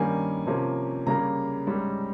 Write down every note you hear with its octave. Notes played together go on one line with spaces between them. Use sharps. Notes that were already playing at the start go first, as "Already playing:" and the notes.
Already playing: G2 D#3 G3 A#3 C#4 G#5
C3 F3 A#3 C#4
C#3 G3 A#3 C#4 A#5
G#2 G3 C#4